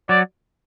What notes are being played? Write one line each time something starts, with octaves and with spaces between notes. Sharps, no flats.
F#3 D5